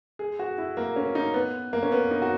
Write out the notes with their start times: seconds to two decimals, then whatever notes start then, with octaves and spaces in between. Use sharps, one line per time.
0.19 G#4
0.39 F#4
0.58 E4
0.77 A#3
0.96 C#4
1.15 D#4
1.34 B3
1.73 A#3
1.83 C#4
1.92 B3
2.11 D#4
2.22 F#4